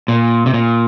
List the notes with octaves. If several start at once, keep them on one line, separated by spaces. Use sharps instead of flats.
A#2
C3
A#2